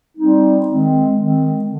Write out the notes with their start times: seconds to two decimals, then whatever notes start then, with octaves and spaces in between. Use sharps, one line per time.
0.18 G3 C4 D#4
0.67 D#3 G#3 C4
1.16 D#3 G#3 C4
1.64 D3